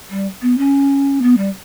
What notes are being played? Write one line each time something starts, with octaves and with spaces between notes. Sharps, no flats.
G3
B3
C#4
B3
G3